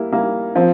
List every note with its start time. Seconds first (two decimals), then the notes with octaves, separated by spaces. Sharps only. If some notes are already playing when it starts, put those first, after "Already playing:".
Already playing: G3 A#3 E4
0.12 G3 A#3 E4
0.55 F3 C4